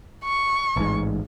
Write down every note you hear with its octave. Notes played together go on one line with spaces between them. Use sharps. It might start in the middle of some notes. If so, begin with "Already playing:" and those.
C#6
A1 G#2